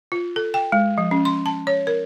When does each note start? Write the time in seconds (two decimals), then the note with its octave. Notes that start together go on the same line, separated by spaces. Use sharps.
0.12 F4
0.36 A4
0.54 G5
0.72 G#3
0.98 F3
1.11 C#4
1.25 C6
1.46 A5
1.67 C#5
1.87 A#4